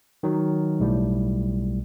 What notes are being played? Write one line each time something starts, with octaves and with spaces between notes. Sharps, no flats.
D#3 F#3
B1 A2 G3